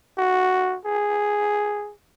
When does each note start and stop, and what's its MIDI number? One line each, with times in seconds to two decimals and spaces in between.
0.18 0.76 66
0.85 1.92 68